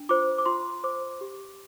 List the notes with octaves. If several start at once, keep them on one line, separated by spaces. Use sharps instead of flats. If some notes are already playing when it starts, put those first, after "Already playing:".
Already playing: D4
F4 C5 D6
D6
F4 C6
C5 D6
G4